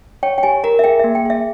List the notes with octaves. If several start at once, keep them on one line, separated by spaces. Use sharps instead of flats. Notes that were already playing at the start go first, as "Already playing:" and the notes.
C#5 G5
G5
G4 G#5
A#4 A#5
E5
G#4 G5
E5
A#3
G5
G#4 E5